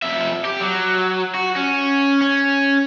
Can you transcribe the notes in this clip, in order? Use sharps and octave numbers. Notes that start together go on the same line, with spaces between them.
F2 E5
G4
F#3
F#4
C#4
C#4